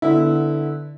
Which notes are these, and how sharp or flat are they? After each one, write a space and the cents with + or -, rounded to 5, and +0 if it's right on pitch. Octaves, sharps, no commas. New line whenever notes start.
D3 +0 B3 -5 E4 -15